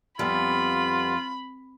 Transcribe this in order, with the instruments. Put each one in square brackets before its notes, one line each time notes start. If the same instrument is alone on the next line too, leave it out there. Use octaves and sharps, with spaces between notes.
[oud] F2 [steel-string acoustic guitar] G3 B3 [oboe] F4 [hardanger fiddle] B5